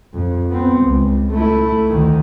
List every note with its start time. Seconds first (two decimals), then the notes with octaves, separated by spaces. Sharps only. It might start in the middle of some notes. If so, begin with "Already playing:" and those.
0.14 F2
0.50 B3 C4
0.82 C#2
1.32 A3 E4
1.87 D2 D#3